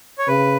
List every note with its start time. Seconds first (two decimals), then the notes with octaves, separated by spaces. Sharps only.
0.18 C#5
0.28 C#3 B4